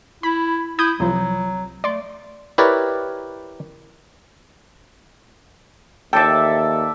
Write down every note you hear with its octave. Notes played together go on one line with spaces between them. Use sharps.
E4 B5
E4 D#6 G6 G#6
C2 F3 F#3
A3 D5 C6
E4 G4 A#4 B4 C#5 D5
D#2 A4 D5 E5 G5 A5